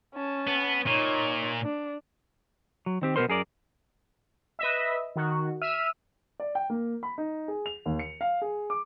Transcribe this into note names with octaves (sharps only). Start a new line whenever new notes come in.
C#4 A5
B3
A#2 D#4 C#5
D4
F#3
D#3 C4 G4
B2 G#3 B3 A#4 C5 C6
F#2 G#4 A#4 D5
B4 D#5 E5
D#3 F#4
E5 E6 F6 D#7
D5
G5
A#3
B5
D#4
G#4
F7
D#2
C#7
F5
G#4
D6